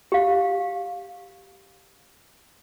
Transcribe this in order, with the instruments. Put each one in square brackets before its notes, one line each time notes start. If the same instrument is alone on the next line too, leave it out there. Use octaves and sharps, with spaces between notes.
[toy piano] G4 F5